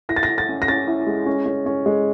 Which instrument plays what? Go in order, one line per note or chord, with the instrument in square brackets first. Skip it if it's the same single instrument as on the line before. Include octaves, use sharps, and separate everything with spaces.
[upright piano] E4 A#6
A6
A#6
E4
A6
C#4
A#6
C#4 A6
E4
G#3
C#4
C#4
C#4
G#3